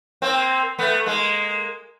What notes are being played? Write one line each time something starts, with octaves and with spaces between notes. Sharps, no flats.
A#3 C4
A3 B3
G#3 A#3